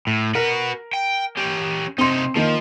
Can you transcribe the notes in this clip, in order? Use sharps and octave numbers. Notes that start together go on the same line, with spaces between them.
A2
F#4 A#4 B4
G5
C#4 G4
C3 C4 D#4 C6
D#3 F3 A#3